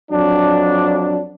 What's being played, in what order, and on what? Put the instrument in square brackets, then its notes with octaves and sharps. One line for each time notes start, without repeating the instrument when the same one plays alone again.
[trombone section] F2 F#3 D4